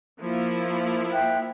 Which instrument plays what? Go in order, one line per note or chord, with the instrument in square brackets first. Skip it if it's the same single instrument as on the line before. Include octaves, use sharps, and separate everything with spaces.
[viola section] F3 A#3 E4
[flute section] E5 G5 F#6